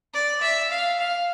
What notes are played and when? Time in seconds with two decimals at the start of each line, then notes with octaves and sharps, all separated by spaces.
0.14 D5
0.42 E5
0.71 F5
0.99 F5